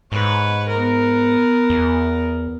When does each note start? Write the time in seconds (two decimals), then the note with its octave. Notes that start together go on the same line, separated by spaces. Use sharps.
0.12 G#2 B4 C#5
0.68 B3 A#4
1.70 E2